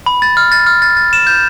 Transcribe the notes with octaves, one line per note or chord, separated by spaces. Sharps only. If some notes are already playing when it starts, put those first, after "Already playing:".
B5
A6
F6
A6
F6
A6
A6
E7
G6